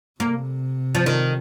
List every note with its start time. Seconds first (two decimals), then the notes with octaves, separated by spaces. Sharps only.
0.20 C3 A#3
0.95 F3
1.06 D#3